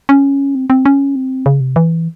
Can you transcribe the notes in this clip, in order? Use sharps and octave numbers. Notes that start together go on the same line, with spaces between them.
C#4
C4
C4
C#4
C4
C#3
C3
E3